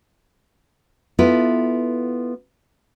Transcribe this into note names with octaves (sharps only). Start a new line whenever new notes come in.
B3 E4 F4 A4 B4